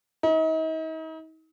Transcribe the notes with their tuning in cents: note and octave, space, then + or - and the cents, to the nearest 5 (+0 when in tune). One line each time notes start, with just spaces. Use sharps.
D#4 +40